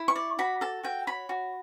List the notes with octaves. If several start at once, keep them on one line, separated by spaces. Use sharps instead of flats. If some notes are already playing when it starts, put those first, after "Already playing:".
Already playing: E4
C#6
D5
F#4 B5
A4 A5
F#4 G5
C#5 B5
F#4